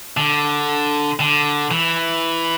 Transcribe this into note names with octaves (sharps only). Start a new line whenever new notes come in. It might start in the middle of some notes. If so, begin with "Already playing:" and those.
D3
D3
E3